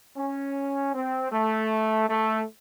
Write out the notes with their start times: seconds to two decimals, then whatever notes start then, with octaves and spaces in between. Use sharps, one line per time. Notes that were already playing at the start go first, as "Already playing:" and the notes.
0.17 C#4
0.94 C4
1.32 A3
2.09 A3